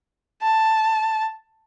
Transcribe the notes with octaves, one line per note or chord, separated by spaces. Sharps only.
A5